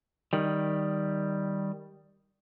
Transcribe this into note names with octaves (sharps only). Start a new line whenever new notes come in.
D#3 G3